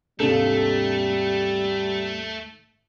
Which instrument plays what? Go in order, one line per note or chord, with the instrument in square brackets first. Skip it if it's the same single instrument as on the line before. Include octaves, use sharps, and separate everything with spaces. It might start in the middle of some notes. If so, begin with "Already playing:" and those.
[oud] D#2 D4 A4 [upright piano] G#2 C3 [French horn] G3 [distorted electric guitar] A3